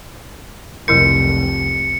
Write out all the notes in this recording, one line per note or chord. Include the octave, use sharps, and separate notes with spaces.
F1 C2 F#3 E4 A#4 C#7